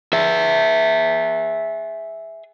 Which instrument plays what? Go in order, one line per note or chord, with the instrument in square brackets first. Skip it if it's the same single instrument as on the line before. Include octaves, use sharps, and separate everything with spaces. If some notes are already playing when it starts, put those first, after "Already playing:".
[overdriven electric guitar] G#4 E5